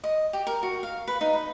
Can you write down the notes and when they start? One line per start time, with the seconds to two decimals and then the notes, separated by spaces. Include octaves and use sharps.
0.04 D#5
0.33 G4
0.47 A#4
0.63 F#4
0.83 F5
1.08 B4
1.21 D#4
1.34 B4